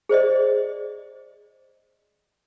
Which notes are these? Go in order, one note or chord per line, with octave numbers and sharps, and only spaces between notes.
G#4 C5 D5 D#5